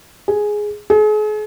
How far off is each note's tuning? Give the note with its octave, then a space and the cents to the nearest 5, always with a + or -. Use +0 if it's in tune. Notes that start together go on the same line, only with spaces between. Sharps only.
G#4 +5
G#4 +40